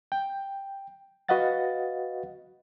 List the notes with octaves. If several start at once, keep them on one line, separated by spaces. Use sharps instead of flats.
G5
F#4 B4 D#5 F5 F#5 A6